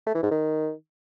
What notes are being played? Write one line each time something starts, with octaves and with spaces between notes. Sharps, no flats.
A3
E3
G#2
D#3